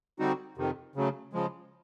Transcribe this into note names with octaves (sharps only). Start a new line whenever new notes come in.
D3 G3 C4 D#4 F#4
F2 C3 D#3
C#3 F#3 A3
C#3 F3 G#3